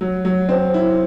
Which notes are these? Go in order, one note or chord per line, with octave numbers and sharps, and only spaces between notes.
F#3
F#3
C4
E4